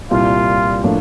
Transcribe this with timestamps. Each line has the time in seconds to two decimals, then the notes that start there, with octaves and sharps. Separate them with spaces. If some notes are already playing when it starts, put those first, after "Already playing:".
0.11 C2 A#2 G3 F4
0.83 A2 F3 A#3 D4